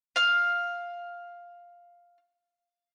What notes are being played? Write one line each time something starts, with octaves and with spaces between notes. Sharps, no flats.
F5 F6